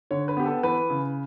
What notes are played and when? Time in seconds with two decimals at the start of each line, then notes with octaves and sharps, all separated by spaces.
0.11 D3 C#5
0.28 B4
0.37 B3 G4
0.45 A4
0.63 E3 B4
0.90 C#3